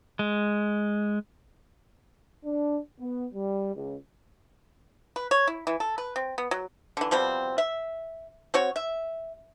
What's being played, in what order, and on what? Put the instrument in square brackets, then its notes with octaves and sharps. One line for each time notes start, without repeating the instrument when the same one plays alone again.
[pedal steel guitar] G#3
[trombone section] D4
B3
G3
C#2
[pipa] B4
C#5
E4
E3
A4
B4
C4
B3
F#3
D3 E3
B2 F3 G3 C4
E5
C4 F#4 C#5
E5